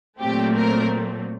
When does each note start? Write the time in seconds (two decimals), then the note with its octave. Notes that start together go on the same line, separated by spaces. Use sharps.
0.20 A#2 F#3 A3 C4 G4
0.56 A#4